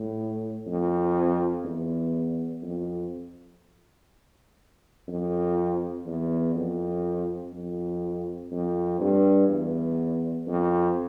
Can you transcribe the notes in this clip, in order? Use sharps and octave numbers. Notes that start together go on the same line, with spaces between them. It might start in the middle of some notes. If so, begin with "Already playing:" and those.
Already playing: A2
F2
E2
F2
F2
E2
F2
F2
F2
G2
E2
F2